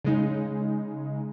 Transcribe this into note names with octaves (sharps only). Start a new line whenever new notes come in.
C#3 G#3 D#4